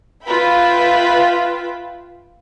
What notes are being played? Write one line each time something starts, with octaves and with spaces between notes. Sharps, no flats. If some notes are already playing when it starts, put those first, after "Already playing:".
F4 B4 E5 G5 B5